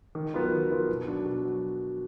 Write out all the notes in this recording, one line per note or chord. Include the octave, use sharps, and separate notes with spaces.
D#3
F#3 B3 F4 A#4
D#3
F#3 B3 F4 A#4
B2
F#3 D4
B2
F#3